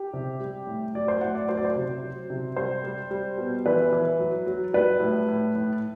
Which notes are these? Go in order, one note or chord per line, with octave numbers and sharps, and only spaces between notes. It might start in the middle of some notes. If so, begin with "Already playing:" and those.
Already playing: G4
C3
G3
A2
F#3 D5
C5
A2 F#5
D5
F#3 C5
D5
C5
C3
F#3
C3
G3 C5
G3
G3
B2
E3 B4
E3
F#3
F#3
G3 B4
A2
A2
A2